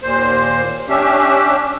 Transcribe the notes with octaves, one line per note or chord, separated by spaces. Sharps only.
D#2 A#2 C5
C#4 D4 G4 E5